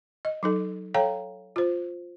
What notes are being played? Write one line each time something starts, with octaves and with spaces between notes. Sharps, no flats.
D#5
F#3 D#4 A4
A4 C#5 F5 G5 A#5
F4 C5